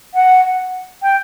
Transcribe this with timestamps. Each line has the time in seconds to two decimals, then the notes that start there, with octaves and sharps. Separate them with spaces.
0.14 F#5
1.02 G5